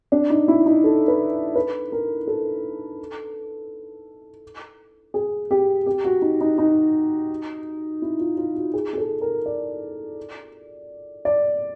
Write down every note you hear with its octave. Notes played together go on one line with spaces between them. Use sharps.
D4
D#4
E4
D#4
A4
B4
B4
A#4
A4
G#4
G4
G4
F#4
D#4
D#4
D#4
E4
F4
F4
F#4
G#4
G#4
A4
A#4
D5
D5